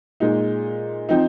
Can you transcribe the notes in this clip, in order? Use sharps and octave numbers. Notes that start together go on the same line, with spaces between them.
A#2 G#3 D#4
F3 C4 D#4